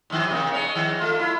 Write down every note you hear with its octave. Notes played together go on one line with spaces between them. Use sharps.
D#2 G#2 D#3
C3 A#3
G#3 C#5
D#3
A3 F4
E4